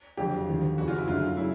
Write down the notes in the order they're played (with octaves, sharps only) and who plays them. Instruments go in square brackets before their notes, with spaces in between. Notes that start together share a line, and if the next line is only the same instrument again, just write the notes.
[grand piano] F2 D3 F#3 G4
D#2 D3 F3
F2 C#3 E3 F#4
F4
E4
F#2 D3 F#3 F4
C#3 F#3 E4